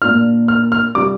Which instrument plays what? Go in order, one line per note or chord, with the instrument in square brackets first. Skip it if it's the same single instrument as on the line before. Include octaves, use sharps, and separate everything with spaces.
[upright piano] A#2 A#3 D4 F4 F6
F6
F6
C3 G3 D4 F4 D6